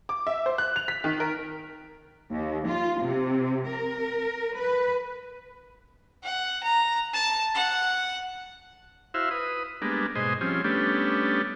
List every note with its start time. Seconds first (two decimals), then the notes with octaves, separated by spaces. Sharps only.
0.09 D6
0.27 E5
0.46 C5
0.58 F#6
0.76 F7
0.88 B6
1.04 D#3
1.20 A#4
2.31 D#2
2.68 F4
3.02 C3
3.69 A#4
4.55 B4
6.23 F#5
6.63 A#5
7.13 A5
7.54 F#5
9.14 E4 F#4 C5 E5 F5
9.31 B4 D#6
9.82 G3 G#3 A#3 B3 D4
10.15 G#2 B2 G#4 C5 D#5
10.41 F3 G3 C4 C#4 G#4
10.64 G3 A3 B3 C#4 D4 G4